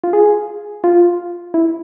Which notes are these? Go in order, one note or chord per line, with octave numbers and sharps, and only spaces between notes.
F4
G#4
F4
E4